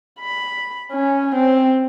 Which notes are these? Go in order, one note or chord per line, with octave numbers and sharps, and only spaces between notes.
B5
C#4
C4